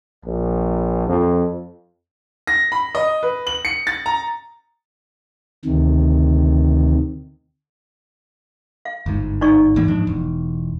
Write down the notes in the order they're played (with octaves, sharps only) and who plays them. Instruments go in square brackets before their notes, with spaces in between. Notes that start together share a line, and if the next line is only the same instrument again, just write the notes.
[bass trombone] A#1
F2
[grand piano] A#6
B5
D#5
B4
F#7
C#7
A6
A#5
[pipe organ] D2 C3 D#3
[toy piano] F5
[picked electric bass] G1 G#2
[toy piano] D#4 D5 C#6
[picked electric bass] G#2 E3 A#3
G#2 F3 D4
E1